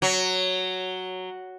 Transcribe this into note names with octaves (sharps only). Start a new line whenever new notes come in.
F#3